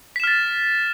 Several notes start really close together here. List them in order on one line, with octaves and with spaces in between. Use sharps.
B6 E7 F6 A6